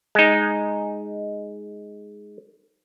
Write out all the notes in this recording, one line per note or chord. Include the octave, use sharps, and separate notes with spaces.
G#3 D#4